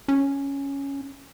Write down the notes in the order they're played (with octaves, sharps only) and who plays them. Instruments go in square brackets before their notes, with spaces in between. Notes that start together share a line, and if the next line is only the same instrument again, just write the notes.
[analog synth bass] C#4